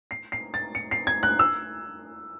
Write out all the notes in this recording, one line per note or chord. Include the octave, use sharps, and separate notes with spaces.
C7
C7
A6
C#7
C7
G#6
F#6
E6